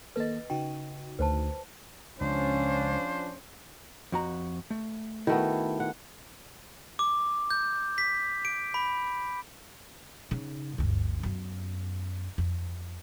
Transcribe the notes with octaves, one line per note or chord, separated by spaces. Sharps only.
D#3 A#3 A4 B4 D#5
C#3 D#4 F#4 G5
D2 B4 C5 A5
C#2 F3 C#4 D4 C5
F2 F#4 A#5
A3
D#3 A3 B3 E4 F#4
F#5
D6
G6
B6
D7
B5
C#3 D#4
G1 D2
F#2 B3
F2